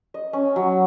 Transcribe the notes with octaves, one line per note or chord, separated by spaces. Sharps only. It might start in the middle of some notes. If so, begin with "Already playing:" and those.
D#5
C#4
F#3